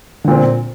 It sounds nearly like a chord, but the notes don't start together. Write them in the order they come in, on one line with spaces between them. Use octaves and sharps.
D3 A#2 C4